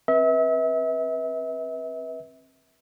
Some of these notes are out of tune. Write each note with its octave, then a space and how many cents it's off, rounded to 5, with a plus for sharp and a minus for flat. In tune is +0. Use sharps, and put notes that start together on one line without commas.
C4 +30 B4 -25 E5 -35